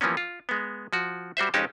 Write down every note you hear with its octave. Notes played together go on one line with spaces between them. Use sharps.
E3 F3 G3 A#3 B3 C#4
F4
G#3 B3
F3 F#4
G3 F#4 C5 E5
F2 G#3 C#4 D#4 G4 A5